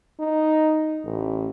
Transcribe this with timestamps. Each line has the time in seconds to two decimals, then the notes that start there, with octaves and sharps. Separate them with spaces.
0.20 D#4
1.05 A1